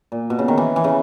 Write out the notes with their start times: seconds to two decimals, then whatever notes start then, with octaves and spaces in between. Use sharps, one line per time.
0.12 A#2
0.30 B2
0.39 C#3
0.48 D#3
0.58 E3
0.76 E3
0.84 C#3